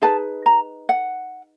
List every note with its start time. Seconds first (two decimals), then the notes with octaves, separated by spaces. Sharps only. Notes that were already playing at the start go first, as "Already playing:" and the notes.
0.02 D#4 G#4 B4 A5
0.46 A#5
0.89 F#5